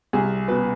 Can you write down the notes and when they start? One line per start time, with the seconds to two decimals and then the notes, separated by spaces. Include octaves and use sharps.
0.13 C2 G#4
0.48 B2 B4